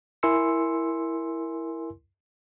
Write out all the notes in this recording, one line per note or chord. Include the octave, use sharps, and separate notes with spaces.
E4 A#4 G#5 C6 E6 C#7